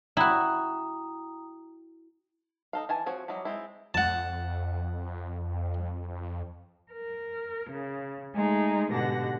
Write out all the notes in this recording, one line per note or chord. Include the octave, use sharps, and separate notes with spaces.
E4 F#4 G5 A#5 D#6
D#4 A4 F5
E3 G#5 A5
F3 C4 F#4 C#5
F#3 G3 D#4 E4
G#3 C4 E4
F2 F#5 A5
A#4
C#3
G#3 A3 D#4 G#4
G#2 B2 D3 G4 F#5 A#6